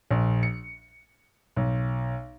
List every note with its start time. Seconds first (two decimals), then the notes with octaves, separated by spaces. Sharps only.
0.11 A#1
0.43 C#7
1.56 B1